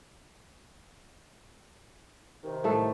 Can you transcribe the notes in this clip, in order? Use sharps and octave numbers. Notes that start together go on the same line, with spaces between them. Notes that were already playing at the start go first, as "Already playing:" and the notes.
C3 D#3
A2 A3 A4